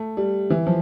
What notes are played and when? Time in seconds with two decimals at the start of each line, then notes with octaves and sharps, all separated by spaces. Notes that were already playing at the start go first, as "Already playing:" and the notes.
Already playing: A3
0.17 G3
0.50 E3
0.67 F3